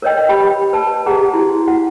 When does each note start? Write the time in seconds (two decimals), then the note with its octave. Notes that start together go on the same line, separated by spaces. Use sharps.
0.02 A#4 B4 C#5 D#5 G5
0.29 G4 G5 B5
0.73 B4 A5
1.06 G4 G#4 F#5 A#5
1.33 E4 F#4 C6
1.68 F#5